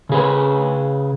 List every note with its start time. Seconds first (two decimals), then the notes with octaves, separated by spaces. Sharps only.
0.09 C#3 G#4 B4